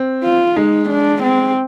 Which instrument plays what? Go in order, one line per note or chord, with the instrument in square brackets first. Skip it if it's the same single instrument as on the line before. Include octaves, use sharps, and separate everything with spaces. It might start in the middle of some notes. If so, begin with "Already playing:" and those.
Already playing: [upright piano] C4
[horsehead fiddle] F4
[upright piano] G#3 [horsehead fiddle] D#4
[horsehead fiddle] D4
C4